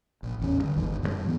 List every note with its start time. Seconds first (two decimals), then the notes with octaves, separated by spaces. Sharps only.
0.23 A#1
0.40 A1 E2 C#4
0.61 D3 G3
0.76 G1 D#2 G#2 E3
1.02 F#2 C3 G3
1.24 G#2 E3 B3